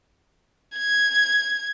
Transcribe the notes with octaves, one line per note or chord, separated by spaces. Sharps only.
G#6